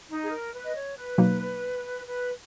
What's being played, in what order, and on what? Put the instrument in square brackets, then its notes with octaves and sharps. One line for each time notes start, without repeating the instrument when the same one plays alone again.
[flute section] D#4
G#4
A#4
B4
D#5
C#5
B4
[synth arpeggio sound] B2 F#3 A#3 D#4
[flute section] B4